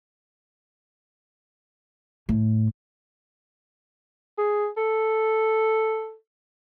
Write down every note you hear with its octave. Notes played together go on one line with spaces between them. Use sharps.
A2
G#4
A4